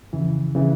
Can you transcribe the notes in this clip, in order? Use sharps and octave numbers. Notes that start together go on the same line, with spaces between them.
F2 C#3 E3
C#3 E3